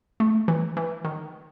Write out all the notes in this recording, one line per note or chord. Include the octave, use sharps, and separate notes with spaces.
A3
E3
E3
D#3